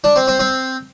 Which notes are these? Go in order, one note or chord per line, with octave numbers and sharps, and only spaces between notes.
D4
C4
C4
C4